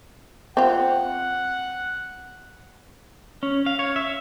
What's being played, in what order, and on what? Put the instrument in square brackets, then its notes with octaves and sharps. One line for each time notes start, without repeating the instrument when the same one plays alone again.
[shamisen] C4 F4 [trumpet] F#5
[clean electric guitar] C#4
F5
C#5
E5